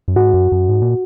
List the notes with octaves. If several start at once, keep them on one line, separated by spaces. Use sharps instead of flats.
F#2
G#2 F#4
F#2
F#2
G#2
A#2